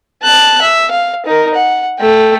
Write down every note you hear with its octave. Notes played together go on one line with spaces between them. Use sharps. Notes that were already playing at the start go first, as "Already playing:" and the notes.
A5 F#6
E5
F5
D#4 A#4
F#5
A3 G5